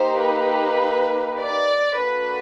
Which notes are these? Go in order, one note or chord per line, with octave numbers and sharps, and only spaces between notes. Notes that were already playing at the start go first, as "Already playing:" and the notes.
Already playing: A#3 D#4 G4 C5
B4
D5
A#3 D4 F#4 A4 B4